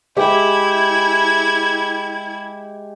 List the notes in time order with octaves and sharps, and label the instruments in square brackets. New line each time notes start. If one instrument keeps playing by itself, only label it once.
[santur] G#3 G4 E5 [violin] E4 G#6